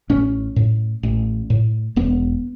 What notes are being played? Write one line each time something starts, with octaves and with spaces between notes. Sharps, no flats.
A1 C#4
A2
A1
A2
E1 B3